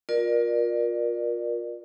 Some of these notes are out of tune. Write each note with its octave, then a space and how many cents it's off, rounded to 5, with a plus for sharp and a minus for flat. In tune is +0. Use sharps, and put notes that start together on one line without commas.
F4 +25 A#4 +25 D5 +25